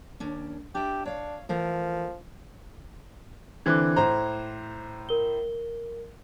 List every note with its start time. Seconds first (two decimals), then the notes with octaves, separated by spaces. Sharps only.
0.20 D#2 C#4 D4
0.75 D4 G4 E5
1.06 D4 C#5 F5
1.49 E3 F3 A3 A#4
3.66 D3 E3 C4 D6 F#6 G#6
3.96 A2 C5 A#5
5.09 A#4 G7